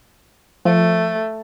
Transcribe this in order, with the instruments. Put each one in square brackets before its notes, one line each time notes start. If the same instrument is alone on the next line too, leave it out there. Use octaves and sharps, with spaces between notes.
[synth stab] F3 [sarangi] A3